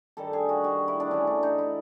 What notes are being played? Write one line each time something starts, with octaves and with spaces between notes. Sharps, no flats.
G2 D#3 G3 A4
G#4
F#4
F#4
E4
D4
A2 E3 A3 C#4
D4
D#4
E4